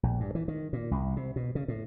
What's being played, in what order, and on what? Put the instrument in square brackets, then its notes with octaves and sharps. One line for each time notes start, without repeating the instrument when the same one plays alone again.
[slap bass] A#1
G2
E3
D#3
A#2
C2
C3
B2
C#3
A2